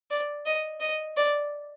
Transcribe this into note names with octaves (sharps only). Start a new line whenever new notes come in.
D5
D#5
D#5
D5